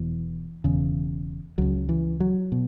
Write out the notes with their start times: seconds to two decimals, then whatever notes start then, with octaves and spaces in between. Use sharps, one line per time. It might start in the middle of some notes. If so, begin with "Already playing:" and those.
Already playing: E1 E2 B2 E3
0.64 E1 E2 C#3
1.58 C#2 C#3 F#3
1.89 E3
2.20 F#3
2.52 B2